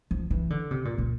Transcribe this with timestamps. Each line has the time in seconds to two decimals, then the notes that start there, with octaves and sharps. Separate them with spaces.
0.11 F3
0.31 E3
0.50 D3
0.71 C3
0.85 A#2
0.98 A#2